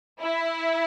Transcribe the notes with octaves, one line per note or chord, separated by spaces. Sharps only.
E4